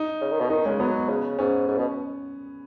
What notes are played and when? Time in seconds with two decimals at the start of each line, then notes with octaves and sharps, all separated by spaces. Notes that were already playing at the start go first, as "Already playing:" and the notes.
Already playing: D#4
0.21 C#3
0.31 D#3
0.40 B2
0.50 D#3 D#4
0.65 C#3 G#3
0.80 F#3 B3
1.09 C#3
1.39 G#2 C#4
1.68 G#2
1.78 B2